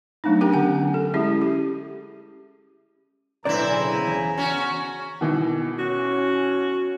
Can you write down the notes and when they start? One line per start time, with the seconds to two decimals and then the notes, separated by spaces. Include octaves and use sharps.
0.24 F#3 A3 B3 D4 D#4
0.41 C#4 D4 G4 A#4 G5 A#5
0.53 D3 F#5 G#5
0.94 A4
1.14 G#3 C#4 E4 G4 G#4 E5
1.42 G4
3.45 B1 A2 D3 E3 C4 E4 D5 A#5
3.69 C#3 G#5 A#5
4.07 E2
4.38 C#4 F#4
5.21 B2 D#3 E3
5.79 C#4 F#4